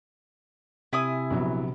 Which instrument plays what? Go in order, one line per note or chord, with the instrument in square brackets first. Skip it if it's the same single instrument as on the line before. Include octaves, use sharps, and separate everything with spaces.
[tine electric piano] C3 [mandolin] E4 G#5 D#6
[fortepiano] A#1 F#3 B3